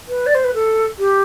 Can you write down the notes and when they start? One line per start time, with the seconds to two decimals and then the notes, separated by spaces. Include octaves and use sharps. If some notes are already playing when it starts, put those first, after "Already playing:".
0.08 B4
0.26 D5
0.35 C5
0.44 B4
0.54 A4
0.99 G4